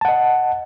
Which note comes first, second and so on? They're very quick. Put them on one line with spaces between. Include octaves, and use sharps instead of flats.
A5 F#5 D#5